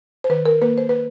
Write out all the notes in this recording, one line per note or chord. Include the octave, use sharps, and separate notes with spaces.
C5
D#3 B4
A#4
A#3 B4
C5
B4